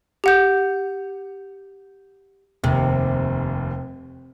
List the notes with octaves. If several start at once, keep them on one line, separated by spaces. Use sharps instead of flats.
G4 F#5 G6
F1 D#2 C3